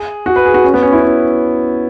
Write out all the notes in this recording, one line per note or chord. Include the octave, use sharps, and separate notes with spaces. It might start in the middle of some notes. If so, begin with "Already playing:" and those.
Already playing: G#4
F#4
B4
G#4
F#4
C#4
B3
C#4
E4
C#4